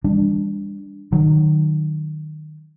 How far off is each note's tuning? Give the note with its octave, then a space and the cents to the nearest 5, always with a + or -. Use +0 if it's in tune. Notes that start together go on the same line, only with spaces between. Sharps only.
E3 +0 G3 +35 D4 +0
D#3 -25 F#3 +0